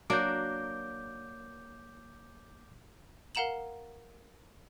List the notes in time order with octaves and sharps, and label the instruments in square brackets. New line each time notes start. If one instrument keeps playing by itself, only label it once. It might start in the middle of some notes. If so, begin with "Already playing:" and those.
[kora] F#3 A#3 D4 [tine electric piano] D6 G6
[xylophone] A#4 F5 F#5 A#5 E7 F#7